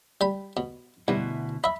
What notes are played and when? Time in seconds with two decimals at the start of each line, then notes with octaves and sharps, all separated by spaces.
0.21 G3 B5
0.57 B2
1.08 D2 G2 B2 E4
1.64 D#5 E5 B5